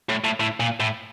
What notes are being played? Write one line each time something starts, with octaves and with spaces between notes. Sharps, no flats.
A2
A2
A2
A#2
A2